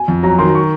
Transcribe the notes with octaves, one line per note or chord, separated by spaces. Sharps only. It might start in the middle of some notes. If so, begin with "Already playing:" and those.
Already playing: G#5
F2
F#3 A#5
D#3 C6
C#6